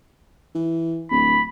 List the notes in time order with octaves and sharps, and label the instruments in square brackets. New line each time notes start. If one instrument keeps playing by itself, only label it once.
[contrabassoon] E3
[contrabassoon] D1 [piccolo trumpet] B5